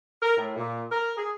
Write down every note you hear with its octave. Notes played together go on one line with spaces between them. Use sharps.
A#4
A2
A#2
A#4
G#4